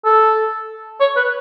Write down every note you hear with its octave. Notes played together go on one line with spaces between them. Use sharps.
A4
C#5
B4